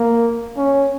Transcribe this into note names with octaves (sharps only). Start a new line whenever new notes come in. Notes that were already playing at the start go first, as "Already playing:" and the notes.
Already playing: A#3
C#4